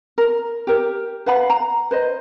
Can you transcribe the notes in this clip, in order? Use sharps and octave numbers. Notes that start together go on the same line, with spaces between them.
A#4
G4 A#4
B4 F5 F#5 B5
A#5
B4 C5 D#5